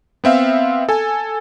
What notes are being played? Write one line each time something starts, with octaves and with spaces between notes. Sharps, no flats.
B3 C4 E5 F5
A4 G#5